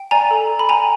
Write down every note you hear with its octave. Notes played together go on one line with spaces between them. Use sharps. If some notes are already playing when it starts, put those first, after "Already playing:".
Already playing: G5
D5 G#5 A#5
A4
A4
B5
G5 G#5 A#5